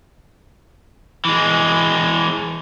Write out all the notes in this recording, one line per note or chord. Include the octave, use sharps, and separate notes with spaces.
E3 G#3